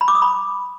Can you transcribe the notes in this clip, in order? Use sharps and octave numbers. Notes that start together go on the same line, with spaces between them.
B5
D6
D#6
B5